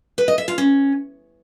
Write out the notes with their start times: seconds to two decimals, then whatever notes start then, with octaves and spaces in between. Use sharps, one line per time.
0.18 B4
0.28 D#5
0.38 E5
0.48 F4
0.58 C#4